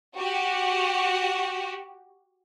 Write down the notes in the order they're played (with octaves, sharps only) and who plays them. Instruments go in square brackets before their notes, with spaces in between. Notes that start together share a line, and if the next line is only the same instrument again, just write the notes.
[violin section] F#4 G4